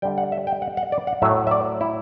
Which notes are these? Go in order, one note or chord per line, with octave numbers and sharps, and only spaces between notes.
D3 G3 G5
F#5
E5
G5
F#5
F#5
D5
F#5
A2 F#3 A3 E5
E5
D5
E4